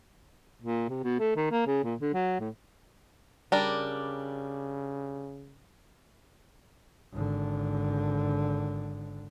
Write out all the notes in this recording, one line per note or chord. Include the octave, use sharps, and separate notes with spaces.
A#2
C3
B2
A3
D#3
A#3
C#3
A#2
D3
F#3
A2
C#3 G3 D4 A#4
G#1 D3